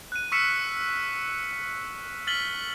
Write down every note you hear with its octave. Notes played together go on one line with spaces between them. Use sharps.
F#6 D#7
C#6 E6 F6 B6 C#7 E7
F6 A6 B6 F#7 G7